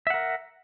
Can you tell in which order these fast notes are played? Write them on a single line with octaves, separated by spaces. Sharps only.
E5 F#5 A#4